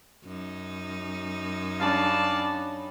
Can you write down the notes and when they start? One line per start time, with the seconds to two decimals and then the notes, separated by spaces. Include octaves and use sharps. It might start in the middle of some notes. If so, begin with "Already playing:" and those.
0.24 F#2 D#4
1.81 G3 C#4 D4 D5 F5 A5